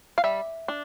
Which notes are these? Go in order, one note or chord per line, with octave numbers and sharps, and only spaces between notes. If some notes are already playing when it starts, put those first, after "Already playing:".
F5
G3 E5
D4